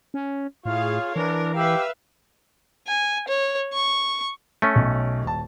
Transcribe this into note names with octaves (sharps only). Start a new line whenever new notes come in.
C#4
A2 F4 G#4 C#5 F5
E3 D4 A#4
G4 B4 E5 F5
G#5
C#5
C#6
A3 C#4
B1
D#1 A5